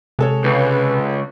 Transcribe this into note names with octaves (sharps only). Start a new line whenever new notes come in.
C3 G#3 A4 C#5
C#2 B4